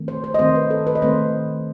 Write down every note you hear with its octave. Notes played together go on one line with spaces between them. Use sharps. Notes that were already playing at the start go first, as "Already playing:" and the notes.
Already playing: D#3 A3 C4
C5
C5
D#5
D#3 A3 C4 C5
B4
A4
B4
D#5
D#3 A3 C4 C5